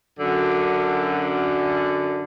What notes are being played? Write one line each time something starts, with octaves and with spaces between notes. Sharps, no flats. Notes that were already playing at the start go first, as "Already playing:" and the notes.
F#2 D3